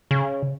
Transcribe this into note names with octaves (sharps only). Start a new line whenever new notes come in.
C#3